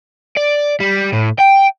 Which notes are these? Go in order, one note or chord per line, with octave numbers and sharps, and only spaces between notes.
D5
G3
A2
G5